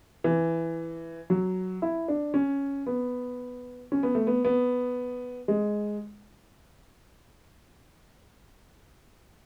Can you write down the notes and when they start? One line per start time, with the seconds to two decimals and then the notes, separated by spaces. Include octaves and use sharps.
0.24 E3
1.30 F#3
1.82 E4
2.08 D4
2.34 C#4
2.86 B3
3.92 C#4
4.03 B3
4.15 A3
4.27 B3
4.45 B3
5.48 G#3